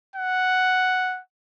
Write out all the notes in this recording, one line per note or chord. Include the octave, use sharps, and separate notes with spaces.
F#5